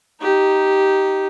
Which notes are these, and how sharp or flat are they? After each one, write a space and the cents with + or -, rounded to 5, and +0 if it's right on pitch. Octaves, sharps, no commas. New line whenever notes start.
D#4 +0 G4 -10